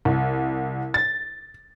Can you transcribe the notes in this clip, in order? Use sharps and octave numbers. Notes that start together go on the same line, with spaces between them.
C2
A6